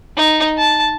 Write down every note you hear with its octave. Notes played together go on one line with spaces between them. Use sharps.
D#4
A5